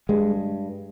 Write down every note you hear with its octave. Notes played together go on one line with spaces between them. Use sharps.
G2 G#3